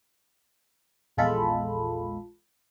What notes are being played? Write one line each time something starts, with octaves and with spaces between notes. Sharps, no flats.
A#1 E2 G#3 F4 A4 B5